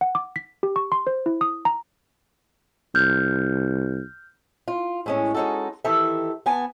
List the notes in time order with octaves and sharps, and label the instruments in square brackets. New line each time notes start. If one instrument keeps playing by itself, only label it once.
[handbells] F#5
D6
B6
G4
C#6
C6
C5
E4
D#6
A#5
[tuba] C2 [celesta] F6 G6
[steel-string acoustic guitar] F4
A2 G#3 C#4
G#3 C#4 D#4 F#4 A4
D#3 E3 G4 A4 E5
B3 G#5 A5